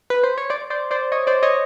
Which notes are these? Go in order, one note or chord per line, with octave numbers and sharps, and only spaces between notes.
B4
C5
C#5
C5 D5
C5 D5
C5 D5
C#5 D#5
C5 D5
C#5 D#5